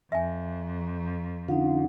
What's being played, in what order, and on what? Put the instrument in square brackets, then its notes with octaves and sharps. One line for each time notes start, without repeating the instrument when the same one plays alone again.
[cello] F2 [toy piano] E5 G#5
[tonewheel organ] D3 F4 [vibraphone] C#4 D#4 F#5